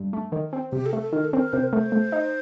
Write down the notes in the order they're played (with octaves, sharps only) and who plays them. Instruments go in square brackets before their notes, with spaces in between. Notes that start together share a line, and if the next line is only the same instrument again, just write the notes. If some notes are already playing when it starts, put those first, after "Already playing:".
Already playing: [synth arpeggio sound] G2
A3
D#3
C4
[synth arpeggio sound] C3 [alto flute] G4
[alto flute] A4
[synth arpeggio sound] A3
[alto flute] A4
[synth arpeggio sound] D#3 [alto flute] A#4
[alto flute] A4
[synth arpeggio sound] C4 [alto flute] A#4
[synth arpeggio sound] C3 [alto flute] C5
[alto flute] A#4
[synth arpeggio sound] A3 [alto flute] C5
[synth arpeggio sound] A3
D#4